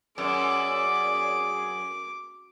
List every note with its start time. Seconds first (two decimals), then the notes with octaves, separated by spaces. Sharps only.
0.18 F#2 G#4 D5 D6